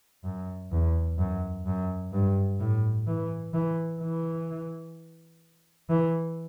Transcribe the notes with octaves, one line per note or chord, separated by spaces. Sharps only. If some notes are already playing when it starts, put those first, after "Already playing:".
F#2
E2
F#2
F#2
G2
A2
E3
E3
E3
E3